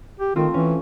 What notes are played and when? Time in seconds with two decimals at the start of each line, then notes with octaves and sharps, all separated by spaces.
0.20 G4
0.36 D#3 A3 C4 F4
0.54 E3 C#4